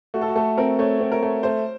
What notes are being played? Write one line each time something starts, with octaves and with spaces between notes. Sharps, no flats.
A3 F#4
A4
F#4
A3 A4
C4 A#4
A3 C#5
C4
A#4
A3
A3 C5